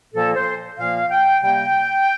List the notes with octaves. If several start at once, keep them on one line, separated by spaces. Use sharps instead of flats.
A#2 F3 A#3 A4
C5
A#2 F3 A#3 F5
G5
C3 G3 A#3 G5